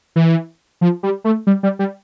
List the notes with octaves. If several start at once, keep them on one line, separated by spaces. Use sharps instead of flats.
E3
F3
G3
A3
G3
G3
G3